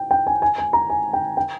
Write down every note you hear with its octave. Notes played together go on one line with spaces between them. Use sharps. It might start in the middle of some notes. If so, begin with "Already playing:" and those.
Already playing: G5
G5
G#5
G#5
G#5
A#5
G#5
G5
G5